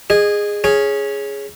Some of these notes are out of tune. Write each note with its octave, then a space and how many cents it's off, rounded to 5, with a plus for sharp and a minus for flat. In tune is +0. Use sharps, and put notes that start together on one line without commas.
G#4 -10 D#5 -25
C#4 +0 G#4 +0